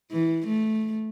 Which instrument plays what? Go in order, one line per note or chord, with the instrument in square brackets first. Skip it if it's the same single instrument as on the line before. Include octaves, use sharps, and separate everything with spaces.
[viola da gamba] E3
A3